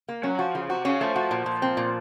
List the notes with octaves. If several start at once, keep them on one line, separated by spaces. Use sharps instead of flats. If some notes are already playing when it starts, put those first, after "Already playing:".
A#3
F#3 C#4
F3 F#4
C#3 F3
C3 F#4
C#3 C#4
F3 A3
F#4
A#2
A#2
C4
A#2